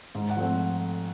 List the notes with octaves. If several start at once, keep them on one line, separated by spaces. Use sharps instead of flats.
G#2
F#5
F3 A3 C4